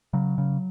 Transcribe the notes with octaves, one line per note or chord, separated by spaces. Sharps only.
C#3 F#3
C#3